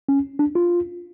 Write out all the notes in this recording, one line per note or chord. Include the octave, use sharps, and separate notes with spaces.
C#4
D4
F4